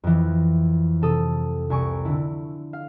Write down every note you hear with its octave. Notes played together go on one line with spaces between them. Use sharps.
F2 E3
C3 A4 D#6
C2 G#5 C#6 D7
D3 E4
F5